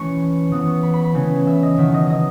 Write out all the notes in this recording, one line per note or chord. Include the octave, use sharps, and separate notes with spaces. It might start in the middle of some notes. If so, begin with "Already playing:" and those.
Already playing: E3 A3 C#4 B5 C#6
E3 B3 D#6
C#6
B5
B5
B5
C#3 E3 A3 C#4
E5
D#5
D#3 F#3 B3 E5
D#5
D#5